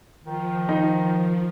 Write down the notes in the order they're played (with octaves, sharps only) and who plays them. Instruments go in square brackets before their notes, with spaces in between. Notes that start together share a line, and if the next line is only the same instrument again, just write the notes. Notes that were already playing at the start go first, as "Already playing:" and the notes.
[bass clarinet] D#3 [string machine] F3
[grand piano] D#4